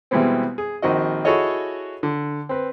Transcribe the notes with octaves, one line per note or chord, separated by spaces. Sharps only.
B2 E3 G3 G#3 B3 C4
G#4
A#1 D#3 C4 F#4 D#5
E4 F#4 G#4 A4 C#5 D#5
D3
C4 B4